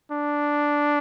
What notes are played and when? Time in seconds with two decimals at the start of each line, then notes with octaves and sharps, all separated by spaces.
0.12 D4